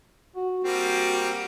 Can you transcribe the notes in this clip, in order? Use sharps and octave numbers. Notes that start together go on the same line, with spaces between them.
F#4
G3 A#3 C4 F#4